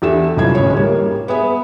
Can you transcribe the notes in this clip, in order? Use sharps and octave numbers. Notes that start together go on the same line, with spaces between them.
E2 D4 G4 A4 E5 E7
E1 C2 F#2 E4 F4 G#6
A1 D2 G#3 C#4 C#5
G3 A#3
B3 G#4 E5